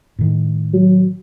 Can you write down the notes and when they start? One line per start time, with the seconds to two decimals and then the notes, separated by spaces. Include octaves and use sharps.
0.19 A2 D#3
0.73 F#3